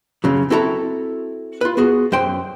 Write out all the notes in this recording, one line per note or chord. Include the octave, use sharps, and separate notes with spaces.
F#2 C#3 F#3
C4 E4 F#4 A4 E5 A#5
F4 B4
B3 F#4 G#4
F#2 C5 G5 C6